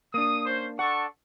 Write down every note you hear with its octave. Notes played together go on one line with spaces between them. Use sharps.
A#3 D4 D#6
C#4 C5
D4 A4 F#5 C#6